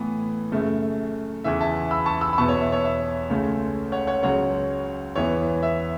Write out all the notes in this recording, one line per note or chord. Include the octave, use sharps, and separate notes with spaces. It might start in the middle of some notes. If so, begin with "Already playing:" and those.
Already playing: A2 E3 B3
F#2 C#3 A3
E2 C#3 E3 E5
E5 A5
B5 E6
A5 C#6
B5 E6
B5
E2 B2 B3 A5 C#6
C#5
E5
C#5
E5
C#2 C#3 A3 C#4
C#5 F#5
C#5 F#5
C#2 C#3 F#3 C#5 F#5
E2 E3 B3 C#5
E5